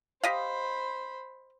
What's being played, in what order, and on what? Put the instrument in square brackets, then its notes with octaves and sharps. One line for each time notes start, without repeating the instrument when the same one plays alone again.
[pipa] G4 D#5 F5 [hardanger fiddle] C5 B5